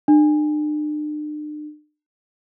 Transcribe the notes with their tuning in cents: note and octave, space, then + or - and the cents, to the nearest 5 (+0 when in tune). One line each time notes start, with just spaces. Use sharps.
D4 +45